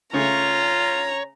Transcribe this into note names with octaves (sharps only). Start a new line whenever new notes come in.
C#3 A3 F4 C#5 A#5